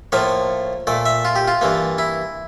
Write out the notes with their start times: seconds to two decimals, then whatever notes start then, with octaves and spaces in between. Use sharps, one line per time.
0.12 A2 F3 A#3 C#5
0.87 A#2 A3 D5
1.06 E5
1.25 F4
1.36 G4
1.48 F4
1.61 G2 E3 A#3
1.98 E4